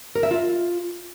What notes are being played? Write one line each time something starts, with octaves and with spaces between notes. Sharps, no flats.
A#4
E5
F4